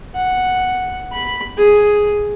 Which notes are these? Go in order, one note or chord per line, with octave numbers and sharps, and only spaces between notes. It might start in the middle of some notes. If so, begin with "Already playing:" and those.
F#5
B5
G#4